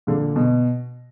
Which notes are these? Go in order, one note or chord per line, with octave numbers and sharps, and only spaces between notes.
A#2 D3
B2